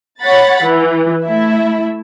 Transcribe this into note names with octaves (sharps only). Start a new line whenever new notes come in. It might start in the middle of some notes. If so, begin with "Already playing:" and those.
C#5 F#5 B5 A6
E3
A3 E4 E5